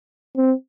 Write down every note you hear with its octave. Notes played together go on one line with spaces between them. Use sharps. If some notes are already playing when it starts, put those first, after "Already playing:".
C4